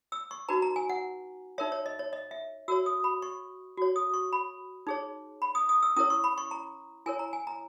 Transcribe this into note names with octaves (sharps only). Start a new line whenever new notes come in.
E6
C#6
D#4 F#4 B4 A#5
A#5
G#5
F#5
D#4 A#4 C#5 E5
C#5
D#5
C#5
D#5
E5
F#4 A#4 C#5 E6
D#6
B5
C#6
F#4 C#5
D#6
C#6
B5
D#4 G#4 C#5
B5
D#6
D#6
E6
C#4 E4 A#4 C#5 D#6
C#6
B5
C#6
A#5
E4 A#4 C#5 G#5
A#5
G#5
A#5